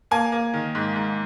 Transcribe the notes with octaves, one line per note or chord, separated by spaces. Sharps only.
A#3 G#5
A#3
D#3
G#2
G#2